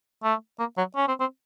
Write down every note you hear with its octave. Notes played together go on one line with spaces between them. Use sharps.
A3
A#3
F#3
C#4
C4
C4